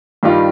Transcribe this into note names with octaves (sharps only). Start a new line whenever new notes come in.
G2 D#3 G3 D4 F4